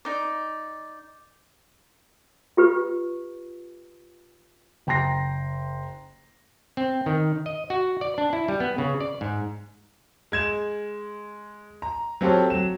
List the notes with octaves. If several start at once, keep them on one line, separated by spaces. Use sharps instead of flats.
D#4 D5
F4 G4 B4
F#1 G5 A#5 C6 A#6 C7
C4
D#3
D#5
F#4
D5
D4
E4
G3
B3
C#3
D5
G#2
G#3 G#6 E7
A#5
F#3 C4 F4 G4 A4 C#5
F#3 E7